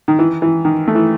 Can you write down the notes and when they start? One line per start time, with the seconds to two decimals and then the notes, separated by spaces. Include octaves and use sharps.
0.08 D#3
0.19 E3
0.42 E3
0.65 D#3
0.88 A3
0.95 E3